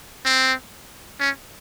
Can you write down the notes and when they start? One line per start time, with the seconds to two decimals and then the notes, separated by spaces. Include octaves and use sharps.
0.25 C4
1.20 C#4